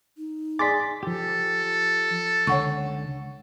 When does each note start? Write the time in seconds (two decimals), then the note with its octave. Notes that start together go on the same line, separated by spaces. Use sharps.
0.18 D#4
0.59 G#4 D5 C6 D6 A6 B6
1.03 F3 G4 A4
2.47 C#2 D3 C#5 F#5 C#6